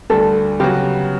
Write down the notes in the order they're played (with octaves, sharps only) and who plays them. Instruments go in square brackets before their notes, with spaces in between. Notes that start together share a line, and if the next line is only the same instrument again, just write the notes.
[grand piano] D2 D3 G3 [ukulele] A4
[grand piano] C#3 F#3 B3 F#4 [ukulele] G4